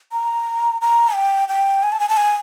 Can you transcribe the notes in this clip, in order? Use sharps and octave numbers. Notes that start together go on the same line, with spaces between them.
A#5
A#5
G5
G5
G#5
A5
G#5
A5
G#5